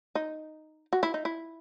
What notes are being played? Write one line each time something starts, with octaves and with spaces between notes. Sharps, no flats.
D#4
F#4
E4
D#4
E4